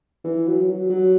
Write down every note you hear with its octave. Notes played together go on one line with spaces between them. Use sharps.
E3
F#3
F#3
F#3